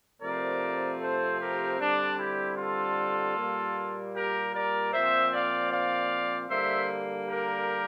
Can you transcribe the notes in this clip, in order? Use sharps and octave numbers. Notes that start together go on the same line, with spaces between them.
C3 F3 A3 C4 A#4 D5
A4 C5
G4 A#4
D3 G3 C4 D4
E4 G4
F4 A4
A#2 G3 A#3
G4 A#4
A#4 D5
A#2 F3 C4 C5 E5
D5 F5
D5 F5
D3 G3 A#3 C5 E5
G4 A#4